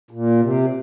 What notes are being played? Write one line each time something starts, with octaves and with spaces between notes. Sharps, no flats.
A#2
C3